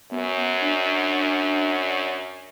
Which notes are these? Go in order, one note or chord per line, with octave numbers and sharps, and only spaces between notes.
F#2 B3
D4